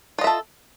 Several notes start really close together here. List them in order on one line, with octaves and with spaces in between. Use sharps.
F4 D#5 E5 A4